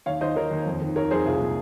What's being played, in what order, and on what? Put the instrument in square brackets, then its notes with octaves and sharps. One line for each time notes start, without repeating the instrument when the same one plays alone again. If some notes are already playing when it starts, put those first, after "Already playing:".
[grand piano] D#2 C#5 F5
D#3 C5 D#5
D#3 A#4 C#5
D#2
F2
D#3
D#3 A#4 C#5
F2 G#4 C5
C2 F4 G#4
A#2